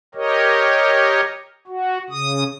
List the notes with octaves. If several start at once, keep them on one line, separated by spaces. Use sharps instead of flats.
G4 A#4 C#5 D#5
F#4
C#3 D#6